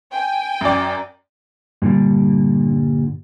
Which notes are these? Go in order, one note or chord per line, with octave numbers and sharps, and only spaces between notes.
G5 G#5
F#2 D5
G2 A#2 D3 G3